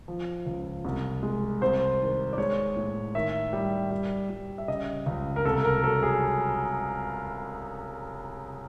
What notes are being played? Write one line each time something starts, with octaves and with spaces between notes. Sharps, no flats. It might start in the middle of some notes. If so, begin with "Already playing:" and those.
F3
C#2
C2
G#3
C2 C5
D#3
D5
G#3 C#5
A2
D#3 E5
G3
G3
G3
E5
C#3 D#5
C#2
A#4
C2 A4
A#4
F#3 A4
G#4